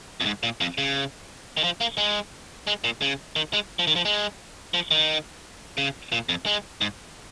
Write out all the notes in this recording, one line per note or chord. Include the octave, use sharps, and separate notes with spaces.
F2
G#2
A#2
F2
C#3
D#3
F3
A#3
G#3
G#3
A#2
C#3
D#3
G#3
F3
D#3
F3
G#3
F3
D#3
C#3
A#2
F2
G#3
G#2